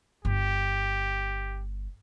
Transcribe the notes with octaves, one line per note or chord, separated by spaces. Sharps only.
G1 G4